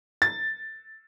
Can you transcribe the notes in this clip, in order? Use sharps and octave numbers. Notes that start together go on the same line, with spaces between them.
A6